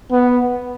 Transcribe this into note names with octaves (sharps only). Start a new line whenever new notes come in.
B3